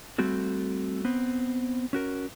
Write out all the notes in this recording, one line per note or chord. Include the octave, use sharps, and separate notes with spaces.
G3 A3 C4 F#4 A4
B3 C4
C#4 F#4 A#4